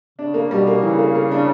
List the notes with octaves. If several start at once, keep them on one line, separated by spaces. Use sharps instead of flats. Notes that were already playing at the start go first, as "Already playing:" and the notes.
C#3 D4
A#3
B2 G3
A#3
C#3 E3
A#3
A#3
D4